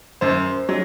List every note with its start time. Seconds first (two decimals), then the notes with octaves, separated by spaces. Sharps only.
0.21 F#2 C5
0.69 F#3